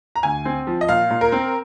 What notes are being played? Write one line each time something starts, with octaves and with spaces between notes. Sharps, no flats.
A#5
D2 G#5
C4
F3
D#5
A#2 F5
A#2
A#4
C4